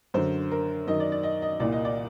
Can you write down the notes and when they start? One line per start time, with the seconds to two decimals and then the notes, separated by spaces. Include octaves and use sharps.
0.14 F#2 D3 C5
0.51 A#4
0.87 F#2 D#3 D#5
1.00 D5
1.12 D5
1.23 D#5
1.42 D#5
1.60 C2 A#2 D5
1.72 D#5
1.85 D5